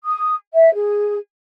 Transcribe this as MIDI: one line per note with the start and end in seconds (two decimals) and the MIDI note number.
0.03 0.34 87
0.54 0.73 76
0.74 1.17 68